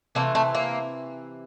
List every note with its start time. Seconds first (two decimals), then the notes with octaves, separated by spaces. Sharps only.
0.15 C3 E3 A3 A#3
0.35 A3
0.55 A#3